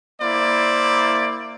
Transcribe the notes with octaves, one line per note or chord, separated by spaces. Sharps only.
A#3 E4 C5 D5